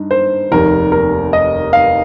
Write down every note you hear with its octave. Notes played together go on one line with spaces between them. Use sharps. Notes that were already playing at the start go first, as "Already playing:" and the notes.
Already playing: G2 D#4
C5
F1 D#2 D#3 A#4
A#4
D#5
F5